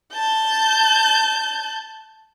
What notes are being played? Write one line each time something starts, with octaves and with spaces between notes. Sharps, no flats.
A5 G6